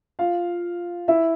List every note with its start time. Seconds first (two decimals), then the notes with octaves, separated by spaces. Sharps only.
0.19 F4 F5
1.08 E4 E5